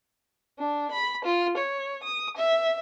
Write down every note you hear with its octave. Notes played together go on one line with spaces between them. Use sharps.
D4
B5
F4
C#5
D#6
E5